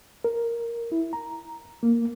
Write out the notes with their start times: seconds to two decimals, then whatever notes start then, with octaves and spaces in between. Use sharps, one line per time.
0.24 A#4
0.92 E4
1.13 A#5
1.83 A#3